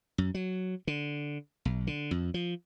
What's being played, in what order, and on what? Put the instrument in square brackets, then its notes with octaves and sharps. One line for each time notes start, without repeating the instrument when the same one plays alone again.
[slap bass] F#2
F#3
D3
B1
D3
F2
F3